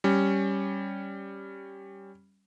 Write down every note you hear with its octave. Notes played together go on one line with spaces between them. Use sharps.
G3 C#4